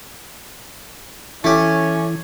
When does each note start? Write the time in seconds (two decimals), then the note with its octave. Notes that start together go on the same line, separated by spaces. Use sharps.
1.44 E3 A3 C#4 G4